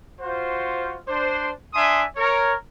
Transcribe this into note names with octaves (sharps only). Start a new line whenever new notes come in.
F4 F#4 C5
D4 C5
D4 E5 G#5 C6 D#6
A#4 C#5